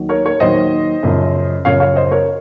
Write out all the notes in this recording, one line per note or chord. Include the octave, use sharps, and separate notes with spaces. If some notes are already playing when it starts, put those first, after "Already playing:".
Already playing: D#2 D#3 F#3
A#4 C#5
A#4 C#5
D#2 D#3 F#3 C5 D#5
F#2 C#3 F3
F#2 C#3 F3 C#5 F5
C#5 F5
C5 D#5
A#4 C#5